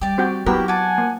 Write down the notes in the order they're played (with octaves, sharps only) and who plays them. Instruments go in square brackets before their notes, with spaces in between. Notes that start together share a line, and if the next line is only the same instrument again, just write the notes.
[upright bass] G3 [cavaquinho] G4 D5
[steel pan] C4 F#4 G5
[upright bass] F#3 [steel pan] B3 F#4 A#4 [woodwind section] E4 G4 [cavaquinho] G5
[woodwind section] F#5 G#5 [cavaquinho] A5 D6
[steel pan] A#3